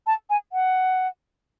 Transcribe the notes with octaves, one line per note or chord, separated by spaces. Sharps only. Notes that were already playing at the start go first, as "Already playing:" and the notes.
A5
G#5
F#5